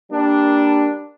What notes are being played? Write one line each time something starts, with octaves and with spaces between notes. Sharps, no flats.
G3 A#3 D4